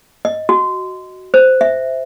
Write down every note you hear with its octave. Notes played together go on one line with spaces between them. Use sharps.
D#5
F#4
C5
E5